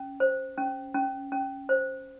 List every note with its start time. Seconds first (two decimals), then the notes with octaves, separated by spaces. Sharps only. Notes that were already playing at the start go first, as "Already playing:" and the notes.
Already playing: C#4
0.20 C5
0.57 C#4
0.94 C#4
1.32 C#4
1.69 C5